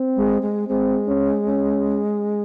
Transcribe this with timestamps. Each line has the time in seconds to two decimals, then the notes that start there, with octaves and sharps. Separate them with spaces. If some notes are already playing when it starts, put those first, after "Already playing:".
Already playing: C4
0.16 G#3
0.42 G#3
0.68 G#3 C4
1.08 C#4
1.47 C#4